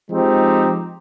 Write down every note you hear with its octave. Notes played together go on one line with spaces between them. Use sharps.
F3 G#3 C4 D#4 G4